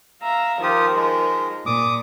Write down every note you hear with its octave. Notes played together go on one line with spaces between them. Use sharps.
E5 F5 A#5
D#3 F3 F4 G4 A#4 D#6
G#3
A#2 D6 D#6